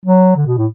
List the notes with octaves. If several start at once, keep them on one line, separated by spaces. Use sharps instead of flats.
F#3
D3
B2
A2